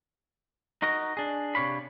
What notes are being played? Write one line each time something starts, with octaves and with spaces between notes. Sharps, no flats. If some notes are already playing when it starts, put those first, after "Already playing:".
D#4 F#4 A#4 D#5
D4 G#4
C3 D4 C#5 F5 B5